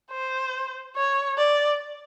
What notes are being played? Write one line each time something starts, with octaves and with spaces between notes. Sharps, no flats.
C5
C#5
D5